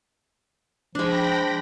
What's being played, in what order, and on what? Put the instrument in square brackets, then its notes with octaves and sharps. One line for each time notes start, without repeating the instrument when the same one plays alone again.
[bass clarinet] F3 [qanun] G#3 D4 [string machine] G5 B5 A#6